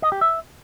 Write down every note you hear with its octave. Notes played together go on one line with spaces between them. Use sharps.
D#5
G4
E5